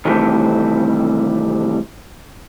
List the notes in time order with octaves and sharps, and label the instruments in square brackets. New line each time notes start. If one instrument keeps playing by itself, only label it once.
[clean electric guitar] C3 D#3 E3 G3 A3 C4